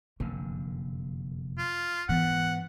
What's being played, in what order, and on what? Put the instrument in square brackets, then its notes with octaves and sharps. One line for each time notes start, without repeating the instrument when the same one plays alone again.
[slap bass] F1 F#2 D3 [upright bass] A#3
[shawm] F4
[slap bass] G#2 [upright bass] E3 B3 [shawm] F#5